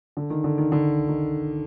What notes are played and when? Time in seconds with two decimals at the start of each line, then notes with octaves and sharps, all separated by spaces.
0.17 D3
0.30 D#3
0.44 D3
0.58 D#3
0.72 D3
1.08 D#3